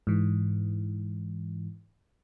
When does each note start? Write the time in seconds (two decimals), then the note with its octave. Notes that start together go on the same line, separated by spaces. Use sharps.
0.07 G#2 E3